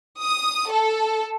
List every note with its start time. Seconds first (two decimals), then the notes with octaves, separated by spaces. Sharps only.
0.21 D#6
0.71 A4